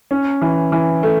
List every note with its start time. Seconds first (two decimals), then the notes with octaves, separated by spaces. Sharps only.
0.11 C#4
0.41 E3
0.72 E3
1.03 A3